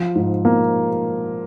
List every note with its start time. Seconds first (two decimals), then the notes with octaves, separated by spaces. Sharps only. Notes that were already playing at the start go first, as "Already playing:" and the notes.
Already playing: F3
0.15 G#2
0.45 A#3